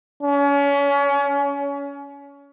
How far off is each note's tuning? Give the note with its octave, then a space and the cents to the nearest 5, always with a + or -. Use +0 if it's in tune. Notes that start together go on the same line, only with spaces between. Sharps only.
C#4 +30